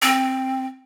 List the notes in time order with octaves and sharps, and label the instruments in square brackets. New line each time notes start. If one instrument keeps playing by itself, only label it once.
[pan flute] C4